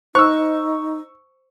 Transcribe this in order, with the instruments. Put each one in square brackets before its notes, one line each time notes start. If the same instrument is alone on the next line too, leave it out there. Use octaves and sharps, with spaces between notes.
[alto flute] D#4 [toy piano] C5 [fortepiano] C#6 E6